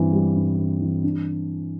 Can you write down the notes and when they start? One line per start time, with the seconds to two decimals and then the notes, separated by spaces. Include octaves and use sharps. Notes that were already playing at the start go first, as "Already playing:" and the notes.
Already playing: G2 E3 G3 C4
0.12 G3
0.36 G2
0.58 C4
0.80 E3
1.04 D4